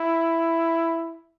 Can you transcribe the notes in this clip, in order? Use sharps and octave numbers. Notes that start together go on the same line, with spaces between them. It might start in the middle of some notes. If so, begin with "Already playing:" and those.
Already playing: E4